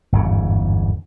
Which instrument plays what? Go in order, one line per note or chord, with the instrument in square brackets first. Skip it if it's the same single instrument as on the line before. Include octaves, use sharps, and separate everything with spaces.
[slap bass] G1 E2 G#2 C#3